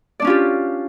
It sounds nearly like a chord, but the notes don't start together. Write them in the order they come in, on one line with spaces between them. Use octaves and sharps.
D5 D4 C#4 F4 G4